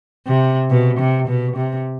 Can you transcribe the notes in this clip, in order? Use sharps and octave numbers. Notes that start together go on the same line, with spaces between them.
C3
B2
C3
B2
C3